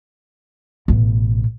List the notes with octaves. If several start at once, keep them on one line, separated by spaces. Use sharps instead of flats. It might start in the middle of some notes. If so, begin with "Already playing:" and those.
A1 B2